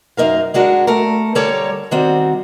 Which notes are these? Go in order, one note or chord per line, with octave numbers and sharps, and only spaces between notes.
F#2 D#4 A#4 F5
G#3 D4 F#4 A#4
A3 A4 A#4
D3 G3 A4 A#4 C#5 D5
D#3 G3 C4 F#4